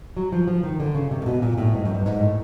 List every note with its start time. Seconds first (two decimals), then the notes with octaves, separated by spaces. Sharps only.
0.17 F#3
0.32 F3
0.48 F3
0.63 D#3
0.80 D3
0.94 C#3
1.11 C3
1.22 A#2
1.26 B2
1.42 A#2
1.58 A2
1.74 G#2
1.85 F#2
1.95 G2
2.06 G#2
2.21 A2